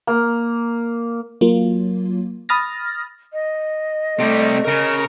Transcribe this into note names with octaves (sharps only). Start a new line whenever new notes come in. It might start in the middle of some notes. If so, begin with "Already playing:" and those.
A#3
F#3 A#3 F4
B5 D#6 F6 A6 A#6
D#5
C3 G3 A3
C#3 A#4